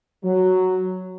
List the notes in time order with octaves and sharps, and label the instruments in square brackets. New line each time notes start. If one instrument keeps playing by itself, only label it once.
[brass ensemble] F#3